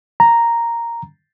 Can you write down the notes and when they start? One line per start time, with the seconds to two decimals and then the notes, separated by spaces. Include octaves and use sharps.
0.20 A#5